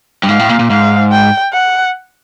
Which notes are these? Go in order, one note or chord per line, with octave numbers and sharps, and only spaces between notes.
G2
G#2 F5
A2
A#2
A#2
G#2 F5
G5
F#5